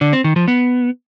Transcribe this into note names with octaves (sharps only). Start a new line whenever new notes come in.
D3
C4
D#3
F3
B3